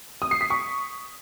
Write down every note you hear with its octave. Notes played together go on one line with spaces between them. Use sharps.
D#6
C7
B6
C#6